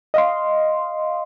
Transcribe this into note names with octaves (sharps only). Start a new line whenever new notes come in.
D#5 F5 C6